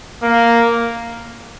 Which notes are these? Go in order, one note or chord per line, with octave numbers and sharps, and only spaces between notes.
A#3